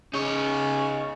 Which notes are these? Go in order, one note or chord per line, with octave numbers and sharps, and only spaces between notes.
C#3 C#4 D#4 C#5